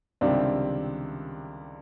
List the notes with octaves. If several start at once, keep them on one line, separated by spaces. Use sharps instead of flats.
C#2 C3 D#3 G3 C4 D4